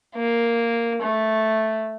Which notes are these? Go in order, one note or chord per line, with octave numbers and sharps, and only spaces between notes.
A#3
A3